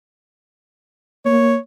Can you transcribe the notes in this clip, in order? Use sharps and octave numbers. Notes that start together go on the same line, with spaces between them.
A#3 C#5